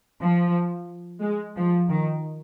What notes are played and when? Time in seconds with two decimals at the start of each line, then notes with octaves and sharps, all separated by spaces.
0.21 F3
1.21 G#3
1.56 F3
1.89 D#3